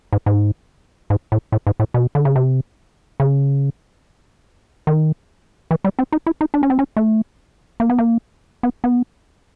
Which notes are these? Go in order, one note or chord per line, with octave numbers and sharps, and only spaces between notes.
G#2
G#2
G#2
A2
A2
G#2
A2
B2
D3
C#3
C3
C#3
D#3
E3
G3
C4
D#4
E4
D#4
D4
C#4
C4
C#4
A3
A#3
B3
A#3
B3
B3